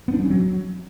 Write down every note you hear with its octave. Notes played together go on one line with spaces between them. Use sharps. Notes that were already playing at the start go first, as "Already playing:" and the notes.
B3
D4
F#3
C#4
F#3